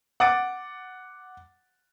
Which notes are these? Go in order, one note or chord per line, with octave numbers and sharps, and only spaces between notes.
F#5 D6 A6 D7